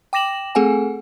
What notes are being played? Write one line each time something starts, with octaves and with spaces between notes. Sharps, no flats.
G5 D6 A#6 E7 F#7
A3 C4 G#4 A4 F#5 G#5